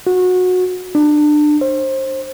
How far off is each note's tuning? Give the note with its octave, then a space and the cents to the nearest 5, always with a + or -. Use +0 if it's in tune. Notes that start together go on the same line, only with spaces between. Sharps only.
F#4 -20
D4 +25
C5 +25